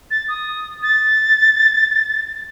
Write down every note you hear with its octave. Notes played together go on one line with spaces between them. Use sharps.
A6
D#6
A6